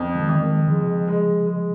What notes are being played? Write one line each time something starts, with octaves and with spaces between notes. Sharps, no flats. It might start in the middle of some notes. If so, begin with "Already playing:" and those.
Already playing: F2
D#3 G#3
F2
D#3 G#3
D#3
C#3 F3 G#3
G#3
G#3